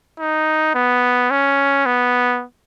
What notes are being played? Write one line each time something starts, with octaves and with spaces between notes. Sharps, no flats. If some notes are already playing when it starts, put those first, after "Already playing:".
D#4
B3
C#4
B3